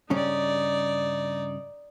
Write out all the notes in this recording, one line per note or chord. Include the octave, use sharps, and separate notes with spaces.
G2 C#3 C#4 D#4 D5